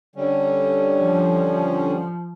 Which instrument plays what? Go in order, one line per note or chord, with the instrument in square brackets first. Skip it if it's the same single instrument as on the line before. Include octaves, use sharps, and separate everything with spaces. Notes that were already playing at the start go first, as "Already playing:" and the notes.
[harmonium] D3 G3 C#4
[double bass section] F3